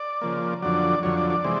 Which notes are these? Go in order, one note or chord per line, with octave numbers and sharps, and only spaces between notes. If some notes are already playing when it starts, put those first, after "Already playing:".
Already playing: D5
C#3 F3 A#3
F2 D3 F#3 D5
F2 D3 F#3 C#5
D5
D5
C3 E3 G#3 C4